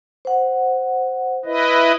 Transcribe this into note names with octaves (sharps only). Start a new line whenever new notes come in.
C5 F#5
E4 B4 D#5